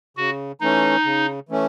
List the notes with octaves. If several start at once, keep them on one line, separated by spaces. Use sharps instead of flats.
C#3 F#4
E3 A3 C#4 D#4
C#3
E3 A3 C#4